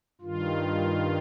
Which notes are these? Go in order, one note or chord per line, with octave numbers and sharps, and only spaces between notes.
G2 D#3 F4